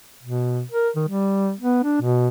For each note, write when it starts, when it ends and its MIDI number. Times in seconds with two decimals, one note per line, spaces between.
0.23 0.62 47
0.71 0.89 70
0.96 1.04 51
1.08 1.52 55
1.60 1.83 59
1.84 1.97 62
2.01 2.28 47